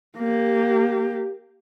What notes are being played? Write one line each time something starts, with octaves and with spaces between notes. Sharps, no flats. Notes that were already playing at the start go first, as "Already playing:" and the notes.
A#3 G4